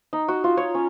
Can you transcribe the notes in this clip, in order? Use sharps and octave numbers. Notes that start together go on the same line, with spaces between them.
D#4
F#4
F4
C#5
C#4